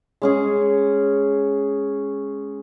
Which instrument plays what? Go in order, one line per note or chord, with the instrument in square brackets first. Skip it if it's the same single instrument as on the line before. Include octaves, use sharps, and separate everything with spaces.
[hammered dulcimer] G#3 C#4 G#4